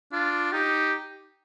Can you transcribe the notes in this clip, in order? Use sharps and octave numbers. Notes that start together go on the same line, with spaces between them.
D4 F4
D#4 G4